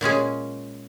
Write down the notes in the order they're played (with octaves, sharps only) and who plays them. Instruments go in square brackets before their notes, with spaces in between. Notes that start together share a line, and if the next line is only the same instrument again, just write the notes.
[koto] A#2 G#3 C#4 G#4